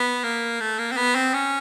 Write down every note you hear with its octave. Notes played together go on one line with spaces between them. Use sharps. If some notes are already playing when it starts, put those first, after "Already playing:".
Already playing: B3
A#3
A3
A#3
C4
B3
C4
C#4